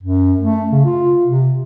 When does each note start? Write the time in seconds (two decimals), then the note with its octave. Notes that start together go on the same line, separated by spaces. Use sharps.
0.03 F#2
0.40 A3
0.72 C#3
0.85 F4
1.25 C3